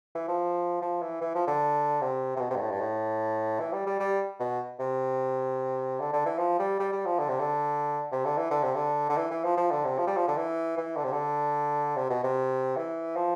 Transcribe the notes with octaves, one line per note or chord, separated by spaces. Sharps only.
E3
F3
F3
E3
E3
F3
D3
C3
C3
B2
C3
G2
A2
G2
A2
E3
G3
G3
G3
B2
C3
D3
D3
E3
F3
G3
G3
G3
F3
D3
C3
D3
C3
D3
E3
D3
C3
D3
D3
E3
E3
F3
F3
D3
C3
F3
G3
F3
D3
E3
E3
D3
C3
D3
C3
B2
C3
E3
F3